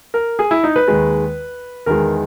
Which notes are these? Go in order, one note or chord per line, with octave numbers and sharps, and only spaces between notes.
A#4
G#4
E4
D#4
B4
D#2 D#3 G#3
E2 D#3 G#3 A#4